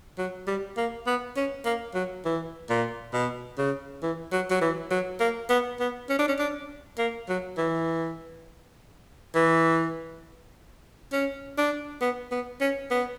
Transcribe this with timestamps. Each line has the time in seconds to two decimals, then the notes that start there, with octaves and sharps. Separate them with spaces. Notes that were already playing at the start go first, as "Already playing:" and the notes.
0.18 F#3
0.47 G3
0.77 A#3
1.06 B3
1.36 C#4
1.65 A#3
1.94 F#3
2.25 E3
2.70 A#2
3.13 B2
3.58 C#3
4.02 E3
4.32 F#3
4.50 F#3
4.61 E3
4.91 F#3
5.20 A#3
5.50 B3
5.79 B3
6.09 C#4
6.19 D4
6.28 C#4
6.39 D4
6.98 A#3
7.29 F#3
7.57 E3
9.35 E3
11.12 C#4
11.58 D4
12.01 B3
12.31 B3
12.61 C#4
12.91 B3